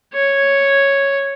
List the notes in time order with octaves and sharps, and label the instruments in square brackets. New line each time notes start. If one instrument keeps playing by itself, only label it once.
[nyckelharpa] C#5